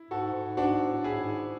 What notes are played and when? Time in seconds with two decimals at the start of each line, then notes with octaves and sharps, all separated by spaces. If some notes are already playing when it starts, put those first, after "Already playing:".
Already playing: E4
0.11 G#2 F#4 A4
0.35 G#2
0.57 G#2 D4 F#4
0.89 A2
1.04 E4 G#4
1.20 G#2